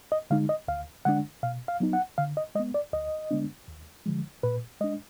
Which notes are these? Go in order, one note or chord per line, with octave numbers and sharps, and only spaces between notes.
D#5
D3 G#3 D#4 F5
D#5
D2 F5
D3 G#3 D4 F#5
B2 F5
F5
F#3 B3 D#4
F#5
D3 F5
D#5
G#3 B3 D#5
D5
D2 D#5
D3 G#3 B3 D4
D#2
D3 F3 G#3
A#2 B4
G#3 D4 D#5